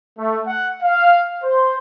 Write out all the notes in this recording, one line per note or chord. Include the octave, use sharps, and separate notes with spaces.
A3
F#5
F5
C5